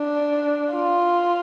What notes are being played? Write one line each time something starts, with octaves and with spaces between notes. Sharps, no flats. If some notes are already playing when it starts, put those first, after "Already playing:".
Already playing: D4
F4